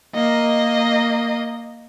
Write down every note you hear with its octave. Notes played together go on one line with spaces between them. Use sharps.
A#3 D#5